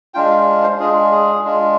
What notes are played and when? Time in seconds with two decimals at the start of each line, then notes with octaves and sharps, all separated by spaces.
0.14 G#3 D4 F4 G5
0.31 F5
0.63 C5
0.79 G#3 D4 F4 G#4
1.12 G#4
1.44 G#3 D4 F4